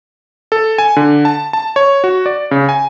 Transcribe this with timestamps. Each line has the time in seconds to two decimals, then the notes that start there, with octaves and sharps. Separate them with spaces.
0.52 A4
0.78 G#5
0.96 D3
1.25 A5
1.53 A5
1.76 C#5
2.04 F#4
2.26 D5
2.51 C#3
2.69 G#5